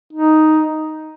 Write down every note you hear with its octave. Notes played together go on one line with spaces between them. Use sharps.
D#4